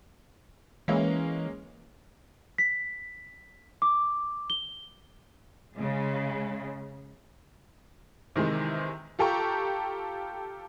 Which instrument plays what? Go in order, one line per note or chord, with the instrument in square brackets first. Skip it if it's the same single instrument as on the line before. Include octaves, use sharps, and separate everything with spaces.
[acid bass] E3 [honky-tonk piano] G#3 A#3 C#4
[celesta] B6
D6
G7
[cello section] C#3 G#3
[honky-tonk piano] C3 D#3 E3 G#3
F4 G4 A4 G5 A#5 C#6